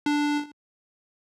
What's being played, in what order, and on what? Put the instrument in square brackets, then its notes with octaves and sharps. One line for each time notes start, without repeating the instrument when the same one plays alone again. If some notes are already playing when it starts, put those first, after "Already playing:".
[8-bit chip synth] D4